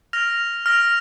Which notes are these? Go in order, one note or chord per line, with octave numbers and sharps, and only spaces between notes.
F6 A#6 F7
F6 A#6 F7